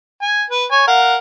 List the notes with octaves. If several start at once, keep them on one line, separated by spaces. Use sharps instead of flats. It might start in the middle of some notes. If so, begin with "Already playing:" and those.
G#5
B4
C#5 G#5
A#4 F5 F#5